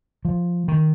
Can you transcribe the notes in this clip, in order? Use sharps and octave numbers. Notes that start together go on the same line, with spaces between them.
F3
D#3